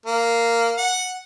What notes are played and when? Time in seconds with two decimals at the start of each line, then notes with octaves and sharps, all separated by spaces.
0.06 A#3
0.78 F#5